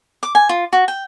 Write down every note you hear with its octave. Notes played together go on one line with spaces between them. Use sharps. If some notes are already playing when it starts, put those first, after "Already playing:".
D6
G#5
F4
F#4
G5